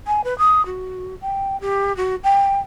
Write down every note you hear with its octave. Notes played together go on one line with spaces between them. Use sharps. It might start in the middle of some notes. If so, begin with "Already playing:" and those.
G#5
B4
D#6
F#4
G5
G4
F#4
G5